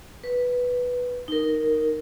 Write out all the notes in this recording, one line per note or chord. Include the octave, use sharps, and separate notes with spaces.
B4
D#4 A#4